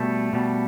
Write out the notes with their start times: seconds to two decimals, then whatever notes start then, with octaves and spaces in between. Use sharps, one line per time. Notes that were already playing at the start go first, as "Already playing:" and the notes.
Already playing: B2 G3 A3
0.33 B2 G3